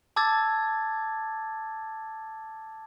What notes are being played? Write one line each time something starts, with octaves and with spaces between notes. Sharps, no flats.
A5 D6 E6 G#6 A6